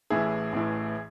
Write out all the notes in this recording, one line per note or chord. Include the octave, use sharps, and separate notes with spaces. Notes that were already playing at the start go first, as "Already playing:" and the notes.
A1 A2 E3 E4 G#4
A1 A2 E3